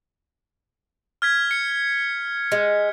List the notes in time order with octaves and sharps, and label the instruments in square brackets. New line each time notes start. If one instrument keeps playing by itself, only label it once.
[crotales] F6 G#6 B6
C#7
[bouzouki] G#3